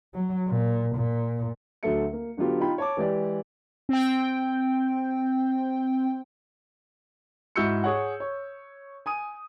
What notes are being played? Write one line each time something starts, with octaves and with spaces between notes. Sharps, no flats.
F#3
A#2
A#2
D2 F#3 A3 A4 E5 C#7
A#3
D3 F#3 B3 F4 G4
D#4 F4 G5 B5
C#5 A5 D6
E3 G#3 G4 D5
C4 G5
G#2 E4 F#4 E6 G6 C#7
G#4 C#5 F#5
C#5
G#5 D#6 D#7